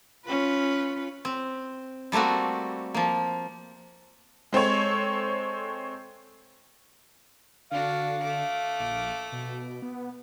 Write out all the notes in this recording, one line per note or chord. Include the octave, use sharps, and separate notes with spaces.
C#4 F4 B4
C4
G3 A3 A#3 C4 F#4
F3 A#3
G#3 C4 A4 C#5
D3 D4 F#4 F5
A3 D6
A#1
B2
B3